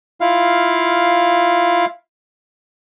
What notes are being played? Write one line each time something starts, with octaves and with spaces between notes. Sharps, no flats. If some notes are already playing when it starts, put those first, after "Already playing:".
E4 F4 F5